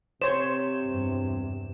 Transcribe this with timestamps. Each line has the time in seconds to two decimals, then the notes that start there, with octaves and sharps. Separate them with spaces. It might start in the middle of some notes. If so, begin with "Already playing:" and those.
0.22 C3 C5 C#5 E7
0.84 E2 G2